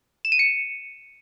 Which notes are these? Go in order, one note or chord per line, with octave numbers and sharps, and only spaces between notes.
E7
D#7
C#7